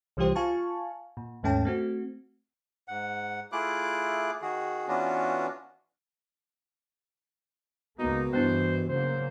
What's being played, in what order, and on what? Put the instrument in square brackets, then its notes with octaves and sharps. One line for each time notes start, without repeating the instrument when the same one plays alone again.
[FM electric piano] C2 E3 G3 F4 G4 C5
F4 F5 G#5 A5 C#6
A#2
D#2 G#2 A3 C#4 G5 A5
A3 C4 F#4
[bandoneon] G#2 F#5
A3 E4 F4 G#4 D6 F#6
D#3 F#4 G#4
E3 B3 C#4 D4 F4 F#4
[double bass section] C#2 A#3 [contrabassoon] B2 [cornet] D#4
[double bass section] G2 E3 G3 [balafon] B3 D4 E4 [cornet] C5
[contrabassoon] F#1 [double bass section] C#3 F#3 A#3 [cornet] C5